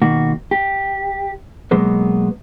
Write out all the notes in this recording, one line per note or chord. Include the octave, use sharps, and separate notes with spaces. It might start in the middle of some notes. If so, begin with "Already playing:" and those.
B2 D#3 A#3 F#4
G4
B2 F#3 G#3 A#3 B3